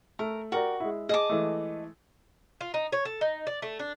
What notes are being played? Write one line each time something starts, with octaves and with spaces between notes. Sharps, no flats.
A3 A#4
F#4 G4 A#4 D5
G#3 E4
G#4 D#5 A5 D6
E3 G#3 A3
F4
D#4
C#5
A4
D#4
D5
A3
D4